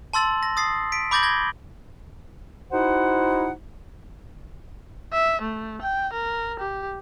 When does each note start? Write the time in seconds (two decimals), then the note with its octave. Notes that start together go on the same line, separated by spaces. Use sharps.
0.13 A5 C6 E6 A6 F#7
0.43 A#6
0.57 D#6 A6 C7
0.92 B6 D7
1.11 B5 D6 G6 A6 A#6 F#7
1.23 G#6 A#6 G7
2.71 D#4 E4 F#4 C5 F#5
5.13 E5
5.41 A3
5.82 G5
6.13 A#4
6.59 G4